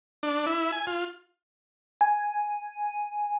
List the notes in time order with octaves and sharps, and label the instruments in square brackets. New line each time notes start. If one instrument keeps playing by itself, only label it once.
[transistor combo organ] D4
E4
G#5
F4
[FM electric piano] G#5